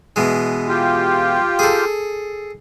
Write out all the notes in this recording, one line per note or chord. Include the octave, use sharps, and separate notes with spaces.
B2 E3 G#3
F4 G4
G#4 A4